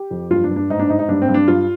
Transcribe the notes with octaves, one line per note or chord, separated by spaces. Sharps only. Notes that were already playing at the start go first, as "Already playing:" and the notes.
Already playing: G4
F2
G2 F4
D4
G2
D4
G#2 D#4
D4
G#2 D#4
D#4
G2 D4
C4
G2
D4
G2 F4